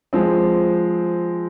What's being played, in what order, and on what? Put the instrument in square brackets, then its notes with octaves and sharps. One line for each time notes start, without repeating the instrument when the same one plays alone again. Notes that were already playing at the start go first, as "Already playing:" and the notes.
[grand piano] F3 G#3 C4